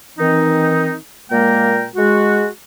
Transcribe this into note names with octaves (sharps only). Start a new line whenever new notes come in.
D#3 E3 C4 D#4
A#2 G#3 A#3 A#4 G5
G#3 F#4